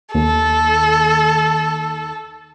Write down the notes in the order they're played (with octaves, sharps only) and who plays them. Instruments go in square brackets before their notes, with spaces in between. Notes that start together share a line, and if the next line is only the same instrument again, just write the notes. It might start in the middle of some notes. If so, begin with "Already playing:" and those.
[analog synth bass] D#2 [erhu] A4